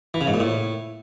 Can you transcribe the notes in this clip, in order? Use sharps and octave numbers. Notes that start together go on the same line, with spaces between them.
E3
C#3
G#2
A#2
A2